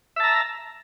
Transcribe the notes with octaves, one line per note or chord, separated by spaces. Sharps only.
E5 A5 A#5